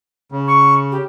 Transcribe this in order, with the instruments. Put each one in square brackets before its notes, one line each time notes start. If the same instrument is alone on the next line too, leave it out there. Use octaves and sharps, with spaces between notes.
[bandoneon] C#3
[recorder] C#6
G4